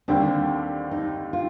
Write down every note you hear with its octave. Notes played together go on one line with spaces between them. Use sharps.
D#2 D3 G3 C4 D4 G4
D#4
F4